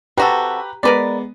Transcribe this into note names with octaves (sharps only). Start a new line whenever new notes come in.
C3 F#4 G4 A4 B4 A#5
G#3 B3 A#4 B4 D5